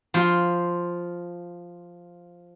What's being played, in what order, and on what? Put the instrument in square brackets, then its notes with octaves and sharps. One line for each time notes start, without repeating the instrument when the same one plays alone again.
[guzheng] F3 [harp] F4 C6